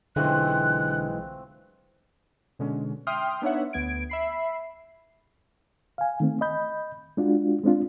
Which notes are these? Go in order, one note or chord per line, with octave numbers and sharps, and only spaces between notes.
B1 D3 E3 G#3 A3 C4 F4 F#6
B2 D3 G#3 C#4
E5 G5 C6 D#6 F6
B3 D4 D#4 C#5 E5 F#5
D2 B3 G#6 D7
E5 B5 C7
F5 G#5
D#3 A3 C4
D#5 B5 G6
G#3 D4 F4 F#4
G#3 C4 D4 F4